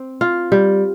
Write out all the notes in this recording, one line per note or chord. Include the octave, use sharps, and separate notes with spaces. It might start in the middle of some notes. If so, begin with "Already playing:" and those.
Already playing: C4
F4
G3